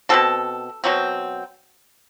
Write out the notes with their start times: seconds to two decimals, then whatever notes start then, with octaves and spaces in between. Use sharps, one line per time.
0.09 B2 F#3 C4 A4
0.84 B2 F#3 C4